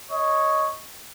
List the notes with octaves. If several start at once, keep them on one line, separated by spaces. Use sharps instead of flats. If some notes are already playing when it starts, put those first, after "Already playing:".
C#5 D#5